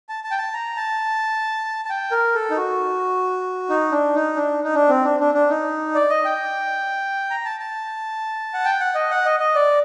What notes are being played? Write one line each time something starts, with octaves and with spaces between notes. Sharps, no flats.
A5
A5
G5
A5
A#5
A5
A5
G5
A#4
A4
D#4
F#4
D#4
D4
D#4
D4
D#4
D4
C4
D4
D4
D4
D#4
D5
D#5
G5
A#5
A5
A5
F#5
G5
F#5
D#5
F#5
D#5
D#5
D5